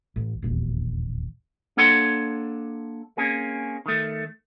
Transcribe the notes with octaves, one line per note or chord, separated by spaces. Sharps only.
A1
E1 A#1 D#2
A#3 D4 A4 C#5 F#5 C6
A#3 C4 C#4 G#4
D#3 A3